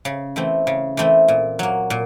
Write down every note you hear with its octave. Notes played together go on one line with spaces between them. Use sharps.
C#3
E3 A3 C4
C#3
E3 A3 C4
A#2
F#3 A#3
A#2